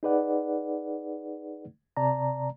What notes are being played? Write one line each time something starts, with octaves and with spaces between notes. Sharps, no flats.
D#4 G#4 B4 D5 F#5
C3 D5 A5 A#5